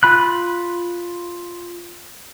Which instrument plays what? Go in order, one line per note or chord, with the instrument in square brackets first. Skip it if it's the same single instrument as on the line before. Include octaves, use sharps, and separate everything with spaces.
[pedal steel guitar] F4 B5 F#6